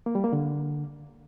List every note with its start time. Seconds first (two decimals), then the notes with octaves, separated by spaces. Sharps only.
0.06 A#3
0.15 G3
0.24 A#3
0.33 D3